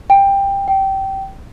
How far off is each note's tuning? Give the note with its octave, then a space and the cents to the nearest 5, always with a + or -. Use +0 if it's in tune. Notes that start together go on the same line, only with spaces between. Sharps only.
G5 +15
G5 -20